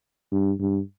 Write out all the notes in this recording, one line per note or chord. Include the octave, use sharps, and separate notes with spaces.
G2
G2